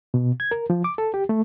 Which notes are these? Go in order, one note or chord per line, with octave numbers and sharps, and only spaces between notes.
B2
G#6
A#4
F3
D6
A4
G4
A3